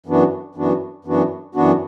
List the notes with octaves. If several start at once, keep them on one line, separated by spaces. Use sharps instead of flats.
F#2 E3 B3 D4 F#4
F#2 E3 B3 D4 F#4
F#2 E3 B3 D4 F#4
F#2 E3 B3 D4 F#4